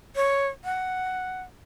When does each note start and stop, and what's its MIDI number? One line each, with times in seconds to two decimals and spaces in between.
0.16 0.47 73
0.64 1.42 78